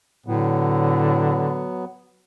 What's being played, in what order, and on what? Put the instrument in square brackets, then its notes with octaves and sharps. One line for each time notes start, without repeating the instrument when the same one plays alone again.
[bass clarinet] A2 [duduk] D3 [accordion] F#3 B3